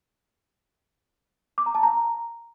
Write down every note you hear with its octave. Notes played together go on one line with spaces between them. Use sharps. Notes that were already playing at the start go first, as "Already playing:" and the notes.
D6
A#5
A5
A#5